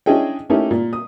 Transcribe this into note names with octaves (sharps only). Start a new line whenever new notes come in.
C#4 D4 E4 G#4 D#5 G5
A3 A#3 C#4 D#4 E4 G4
A#2
D#6